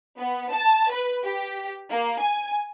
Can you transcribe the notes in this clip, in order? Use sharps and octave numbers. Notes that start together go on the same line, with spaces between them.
B3
A5
B4
G4
A#3
G#5